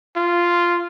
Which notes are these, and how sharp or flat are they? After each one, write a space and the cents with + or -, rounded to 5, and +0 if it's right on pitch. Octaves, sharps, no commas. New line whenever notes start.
F4 -5